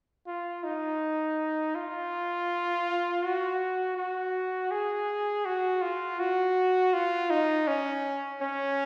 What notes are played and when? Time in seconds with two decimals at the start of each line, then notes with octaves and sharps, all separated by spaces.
0.27 F4
0.64 D#4
1.75 F4
3.23 F#4
3.97 F#4
4.71 G#4
5.45 F#4
5.82 F4
6.19 F#4
6.93 F4
7.30 D#4
7.67 C#4
8.41 C#4